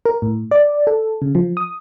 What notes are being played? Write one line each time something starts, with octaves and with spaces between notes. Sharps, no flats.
A#4
A2
D5
A4
C#3
F3
D#6